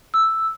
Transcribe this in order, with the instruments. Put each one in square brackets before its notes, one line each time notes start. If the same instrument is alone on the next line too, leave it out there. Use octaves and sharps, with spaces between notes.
[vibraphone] E6